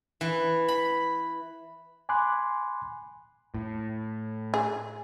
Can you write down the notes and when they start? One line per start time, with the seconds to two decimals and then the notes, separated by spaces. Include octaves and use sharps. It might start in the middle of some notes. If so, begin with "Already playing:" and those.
0.21 E3
0.68 B5
2.09 G#5 B5 C6 D6 F#6
3.54 A2
4.54 G#4